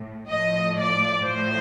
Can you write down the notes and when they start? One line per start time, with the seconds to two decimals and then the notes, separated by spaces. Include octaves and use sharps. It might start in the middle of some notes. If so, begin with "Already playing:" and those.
Already playing: A2
0.29 A2 F3 D#5
0.77 D5
1.24 A2 F3 C5